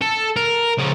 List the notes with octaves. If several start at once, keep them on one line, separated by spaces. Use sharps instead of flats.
A4
A#4
C#3 F3